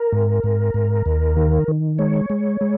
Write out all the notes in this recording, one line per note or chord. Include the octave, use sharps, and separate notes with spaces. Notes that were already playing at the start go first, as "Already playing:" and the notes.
Already playing: A#4
G#2
G#2
G#2
D#2
D#3
D#3
G#3 C#5
G#3
G#3